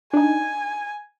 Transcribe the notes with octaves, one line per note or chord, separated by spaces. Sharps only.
D4 D#4 G#5